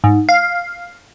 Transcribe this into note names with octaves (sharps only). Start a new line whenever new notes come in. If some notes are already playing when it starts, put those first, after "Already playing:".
G#2
F5